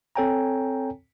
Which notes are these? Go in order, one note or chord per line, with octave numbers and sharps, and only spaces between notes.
C4 A4 C#5 G5 G#5 A#5